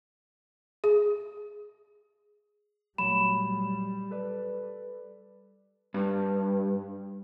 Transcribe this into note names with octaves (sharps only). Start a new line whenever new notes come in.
G#4
A#2 F#3 G3 A3 B5 E7
A4 B4 D5
G2